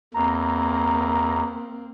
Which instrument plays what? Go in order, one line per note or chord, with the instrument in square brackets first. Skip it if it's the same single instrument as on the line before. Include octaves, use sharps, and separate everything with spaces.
[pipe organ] E2 [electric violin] A#3 C4 [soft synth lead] A#5